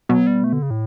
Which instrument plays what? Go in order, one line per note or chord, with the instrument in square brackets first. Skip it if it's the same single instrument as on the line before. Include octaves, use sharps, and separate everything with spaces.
[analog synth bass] B2 [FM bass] F#3
[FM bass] G3
A3
D3
C#3
A2